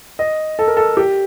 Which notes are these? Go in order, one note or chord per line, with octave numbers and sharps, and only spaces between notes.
D#5
A4
A#4
A4
G4